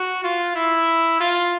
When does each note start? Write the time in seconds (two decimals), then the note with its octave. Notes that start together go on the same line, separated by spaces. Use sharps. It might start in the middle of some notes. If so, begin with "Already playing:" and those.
Already playing: F#4
0.24 F4
0.56 E4
1.21 F4